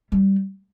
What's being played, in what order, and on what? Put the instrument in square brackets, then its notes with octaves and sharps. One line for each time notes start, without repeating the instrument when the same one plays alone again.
[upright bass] G3